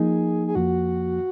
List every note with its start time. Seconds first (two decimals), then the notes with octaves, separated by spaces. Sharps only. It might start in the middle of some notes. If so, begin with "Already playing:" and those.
Already playing: F3 A#3 D#4 G#4
0.48 G#4
0.55 F2 F3 A#3 F#4